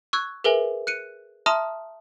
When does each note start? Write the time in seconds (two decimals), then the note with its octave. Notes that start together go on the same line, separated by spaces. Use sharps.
0.13 C#6 E6 F#6 G#6
0.44 G#4 A#4 B4 E5 G#5
0.87 F#6 C#7 D#7
1.46 E5 A5 A#5 C6 D#6 F6